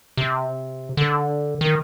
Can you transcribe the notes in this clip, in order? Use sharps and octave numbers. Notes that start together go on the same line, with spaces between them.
C3
D3
D#3